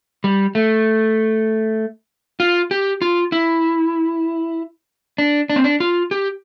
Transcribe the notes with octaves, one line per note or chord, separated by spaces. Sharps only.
G3
A3
F4
G4
F4
E4
D4
D4
C4
D4
F4
G4